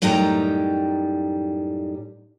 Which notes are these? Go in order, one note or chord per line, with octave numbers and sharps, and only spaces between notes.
F#2 A2 G3 D#4 G5 A#5